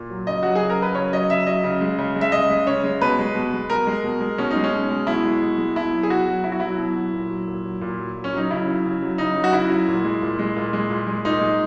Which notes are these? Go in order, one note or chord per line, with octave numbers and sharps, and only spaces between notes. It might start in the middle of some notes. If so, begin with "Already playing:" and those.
Already playing: A#2
F#3
C#3 D#5
F#3 F#4
G#4
C#3
A#4
F#3 B4
C#3 C#5
F#3 D#5
C#3 E5
F#3 D#5
C#3
G#3
C#3
G#3
E5
C#3 D#5
G#3
C#3 C#5
G#3
B2 B4
G#3
B2
G#3
B2 A#4
G#3
B2
G#3
B2 C#4
D#4
G#3
C#4
B2
G#3
B2 E4
G#3
B2
G#3
B2 E4
F#3
G#4
B2 F#4
F#3
B2 E4
F#4
F#3 E4
B2
F#3
A#2
F#3
A#2
F#3
A#2
F#3
A#2
C#4
F#3 D#4
C#3 E4
F#3
C#3
F#3
C#3 D#4
F#3
F#4
C#3 E4
F#3
A#2
G#3
A#2
G#3
A#2
G#3
A#2
G#3
A#2 D#4
G#3